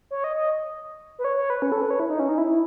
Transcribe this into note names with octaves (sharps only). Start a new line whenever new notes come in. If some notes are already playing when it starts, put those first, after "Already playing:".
C#5
D#5
D#5
B4
C#5
C#5
B4
C#4
A4
B4
C#5
E4
D#4
C#4
D#4
E4